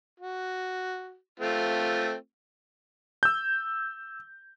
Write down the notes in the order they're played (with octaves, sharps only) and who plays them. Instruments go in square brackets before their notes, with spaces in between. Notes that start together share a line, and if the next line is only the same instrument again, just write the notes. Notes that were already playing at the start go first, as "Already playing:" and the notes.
[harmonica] F#4
A3 C4 F4
[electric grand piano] E6 G6